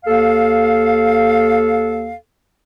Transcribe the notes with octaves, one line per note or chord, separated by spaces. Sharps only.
D#2 A4 F5